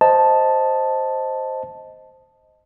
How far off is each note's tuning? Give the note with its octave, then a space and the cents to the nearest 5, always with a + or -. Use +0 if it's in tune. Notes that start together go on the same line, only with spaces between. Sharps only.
C5 +0 D#5 +0 A5 +0